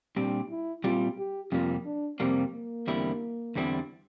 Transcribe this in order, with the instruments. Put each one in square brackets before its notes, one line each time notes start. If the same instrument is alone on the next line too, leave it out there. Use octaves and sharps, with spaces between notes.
[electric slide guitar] A#2 G3 C4 G4 [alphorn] D4
[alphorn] E4
[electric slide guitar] A#2 G3 C4 G4 [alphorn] F4
[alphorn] G4
[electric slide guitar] F2 C3 G3 A#3 [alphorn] F4
[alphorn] D4
[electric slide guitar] F2 C3 G3 A#3 [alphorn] C4
[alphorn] A#3
[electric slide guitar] E2 D3 G3 C4 E4
E2 D3 G3 C4 E4